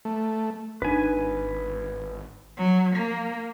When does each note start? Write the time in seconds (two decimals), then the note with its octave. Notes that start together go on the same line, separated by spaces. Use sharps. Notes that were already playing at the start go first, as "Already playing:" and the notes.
0.05 A3
0.82 G#1 D4 D#4 B4 G#5
2.57 F#3
2.95 A#3